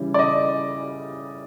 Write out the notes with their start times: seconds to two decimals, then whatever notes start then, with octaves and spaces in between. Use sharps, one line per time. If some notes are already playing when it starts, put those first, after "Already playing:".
Already playing: C#3 E3 G3
0.14 D5
0.19 D#5